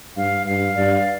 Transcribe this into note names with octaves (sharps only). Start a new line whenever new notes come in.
G2 F5
G2 F5
G2 D5